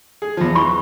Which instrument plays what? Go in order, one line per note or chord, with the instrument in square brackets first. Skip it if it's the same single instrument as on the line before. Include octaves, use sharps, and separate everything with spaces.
[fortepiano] G#4
E2 F3
[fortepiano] E3 [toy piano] B5 C#6